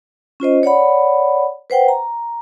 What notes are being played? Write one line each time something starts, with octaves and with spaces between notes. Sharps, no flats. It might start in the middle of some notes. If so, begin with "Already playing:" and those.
C#4 F4 C5 D#5
C#5 D5 F#5 B5
B4 C5 F#5 G5
A#5